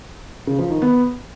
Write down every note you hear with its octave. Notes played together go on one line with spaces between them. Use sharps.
C#3
F3
D#3
B3